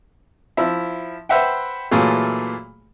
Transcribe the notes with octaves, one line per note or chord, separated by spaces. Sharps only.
F3 E4 E5
B4 C5 E5 F#5 G5
A#2 E3 F#3 A3 F4 G#4